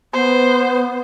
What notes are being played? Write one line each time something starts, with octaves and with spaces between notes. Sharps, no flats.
B3 C5